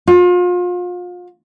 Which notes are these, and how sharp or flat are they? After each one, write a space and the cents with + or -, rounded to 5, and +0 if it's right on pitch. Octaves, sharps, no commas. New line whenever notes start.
F4 +35